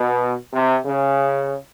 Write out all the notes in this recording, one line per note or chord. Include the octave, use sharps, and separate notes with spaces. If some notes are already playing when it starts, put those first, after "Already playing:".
Already playing: B2
C3
C#3